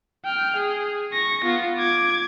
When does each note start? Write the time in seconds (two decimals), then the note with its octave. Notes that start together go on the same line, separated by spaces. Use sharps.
0.25 G5 F6
0.56 G#4
1.13 C#6 A#6
1.44 B3 F4
1.79 D6 G#6